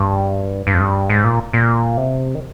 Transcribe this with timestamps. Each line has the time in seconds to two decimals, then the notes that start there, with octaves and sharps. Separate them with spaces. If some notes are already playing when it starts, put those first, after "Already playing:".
Already playing: G2
0.67 G2
0.74 F2
0.80 G2
1.10 G#2
1.24 A#2
1.53 A#2
1.97 C3
2.35 D#3